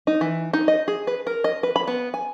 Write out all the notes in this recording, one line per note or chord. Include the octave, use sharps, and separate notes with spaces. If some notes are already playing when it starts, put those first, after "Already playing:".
D#4
E3
D#4
D#5
G#4
B4
A#4
D#5
B4
B5
B3
G#5